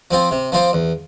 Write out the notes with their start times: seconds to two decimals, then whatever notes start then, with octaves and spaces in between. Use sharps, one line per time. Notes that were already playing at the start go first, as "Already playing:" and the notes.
0.11 F3 C4 F4
0.31 C3
0.52 F3 C4 F4
0.73 E2